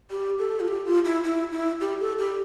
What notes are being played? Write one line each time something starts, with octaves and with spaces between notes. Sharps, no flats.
G4
A4
F4
G4
F4
E4
E4
E4
G4
A4
G4